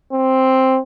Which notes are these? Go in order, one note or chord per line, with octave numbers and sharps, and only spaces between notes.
C4